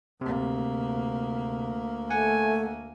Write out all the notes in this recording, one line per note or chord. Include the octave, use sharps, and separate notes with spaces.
D2 C3 A#3
A3 F#5 G#5